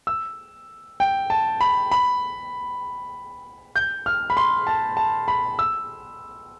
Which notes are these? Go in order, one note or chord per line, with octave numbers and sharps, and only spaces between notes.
E6
G5
A5
B5
B5
G6
F6
B5
C6
A5
A5
B5
E6